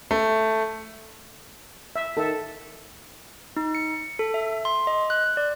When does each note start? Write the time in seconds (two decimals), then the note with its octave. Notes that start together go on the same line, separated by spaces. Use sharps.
0.11 A3
1.96 E5
2.17 D#3 A4 E5
3.57 D#4
3.75 C#7
4.19 A4
4.34 E5
4.65 C6
4.87 D#5
5.10 F#6
5.37 D5